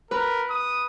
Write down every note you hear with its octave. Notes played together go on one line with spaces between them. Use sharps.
A#4 B4
D#6